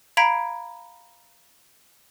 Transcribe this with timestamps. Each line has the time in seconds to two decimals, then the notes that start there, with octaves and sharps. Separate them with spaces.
0.17 F5 A#5 B5 G#6 B6 D7